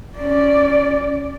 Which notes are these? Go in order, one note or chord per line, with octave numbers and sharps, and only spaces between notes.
C#4 D5